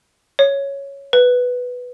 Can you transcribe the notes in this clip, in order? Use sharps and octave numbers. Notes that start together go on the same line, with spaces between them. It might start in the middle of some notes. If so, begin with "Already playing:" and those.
C#5
B4